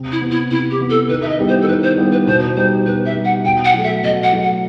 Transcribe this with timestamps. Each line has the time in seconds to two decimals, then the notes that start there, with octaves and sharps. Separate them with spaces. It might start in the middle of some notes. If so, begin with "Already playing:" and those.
Already playing: C3
0.12 E4
0.21 E3 B3
0.31 E4
0.51 C3 E4
0.70 G4
0.80 E3 B3
0.90 A4
1.09 D#3 B4
1.22 E5
1.29 D#5
1.39 G3 B3 E4 G4
1.49 C5
1.61 A4
1.68 D#3 B4
1.83 C5
1.98 G3 B3 E4 G4
2.12 B4
2.27 B2 C5
2.56 G3 D#4 C5
2.86 B2 B4
3.06 E5
3.15 G3 D#4
3.25 F#5
3.44 B2 G5
3.65 F#5
3.74 F#3 A3
3.84 E5
4.03 B2 D#5
4.23 F#5
4.32 F#3 A3
4.43 F#5